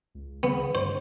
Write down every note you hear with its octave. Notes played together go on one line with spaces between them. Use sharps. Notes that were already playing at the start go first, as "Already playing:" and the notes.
C#2
C#3 B3
G2 C5